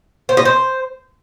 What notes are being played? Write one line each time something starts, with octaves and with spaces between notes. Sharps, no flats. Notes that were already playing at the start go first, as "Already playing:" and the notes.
C5
D#5
C5